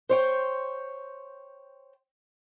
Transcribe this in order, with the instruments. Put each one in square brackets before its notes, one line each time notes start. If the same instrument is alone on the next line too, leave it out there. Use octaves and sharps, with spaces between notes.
[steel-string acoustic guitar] C5 C#5 G5